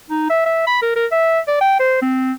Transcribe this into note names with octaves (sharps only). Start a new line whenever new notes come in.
D#4
E5
E5
B5
A#4
A#4
E5
D5
G5
C5
C4